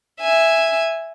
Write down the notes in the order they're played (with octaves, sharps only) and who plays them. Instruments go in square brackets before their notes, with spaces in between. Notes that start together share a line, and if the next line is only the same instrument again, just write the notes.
[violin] E5 G#5